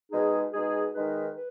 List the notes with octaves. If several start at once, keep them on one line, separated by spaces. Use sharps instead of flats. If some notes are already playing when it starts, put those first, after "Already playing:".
B2 G#3 D#4 G#4
B2 G#3 D#4 G#4
D#3 G#3 D#4 B4
B4